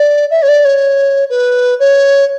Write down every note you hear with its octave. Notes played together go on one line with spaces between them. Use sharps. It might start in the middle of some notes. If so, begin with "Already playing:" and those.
Already playing: D5
E5
C#5
D5
C#5
B4
C#5